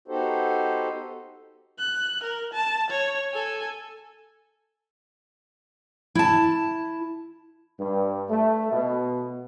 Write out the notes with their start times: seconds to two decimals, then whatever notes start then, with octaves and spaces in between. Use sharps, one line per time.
0.08 B3 D#4 F#4 G4 A4 C5
1.79 F#6
2.23 A#4
2.53 A5
2.90 C#5
3.31 A4 G#5
6.15 E4 A5
7.79 G2
8.30 A3
8.71 B2